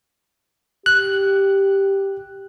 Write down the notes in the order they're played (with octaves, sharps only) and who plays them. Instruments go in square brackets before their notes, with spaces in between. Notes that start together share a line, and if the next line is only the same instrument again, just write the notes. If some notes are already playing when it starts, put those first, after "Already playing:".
[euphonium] G4 [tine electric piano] F#6